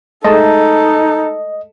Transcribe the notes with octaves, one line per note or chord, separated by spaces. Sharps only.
G#3 A3 D#4 A4 D#5 A5